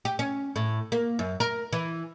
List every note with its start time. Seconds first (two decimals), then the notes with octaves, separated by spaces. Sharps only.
0.05 G4
0.19 C#4
0.56 A2
0.92 A#3
1.19 F#2
1.40 A#4
1.73 E3